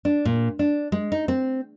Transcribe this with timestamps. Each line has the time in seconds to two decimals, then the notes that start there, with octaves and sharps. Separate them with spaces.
0.05 D4
0.25 A#2
0.59 D4
0.92 G#3
1.12 D#4
1.28 C4